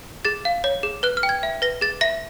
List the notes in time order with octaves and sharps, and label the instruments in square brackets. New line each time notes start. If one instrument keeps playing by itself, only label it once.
[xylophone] G#4 A6
F5
C#5
G#4
B4 F#6
F6
G5
G#6
E5
B4 A#6
G#4 A6
E5 A#6